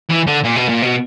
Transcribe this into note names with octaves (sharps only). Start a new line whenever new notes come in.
E3
D3
A#2
B2
A#2
B2